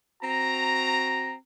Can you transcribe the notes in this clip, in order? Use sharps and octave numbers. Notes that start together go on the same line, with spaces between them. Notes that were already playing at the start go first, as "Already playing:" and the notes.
C4 F#4 A#5